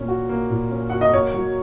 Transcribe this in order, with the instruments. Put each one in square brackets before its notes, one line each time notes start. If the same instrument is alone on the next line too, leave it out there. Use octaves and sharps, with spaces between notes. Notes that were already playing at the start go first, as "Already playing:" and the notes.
Already playing: [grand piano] A#2 A#3 C#4
F#4
A#3
A#2
C#4
[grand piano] F#4 [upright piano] F#5
[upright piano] D#5
[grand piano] A#3 [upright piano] C#5
[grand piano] F#3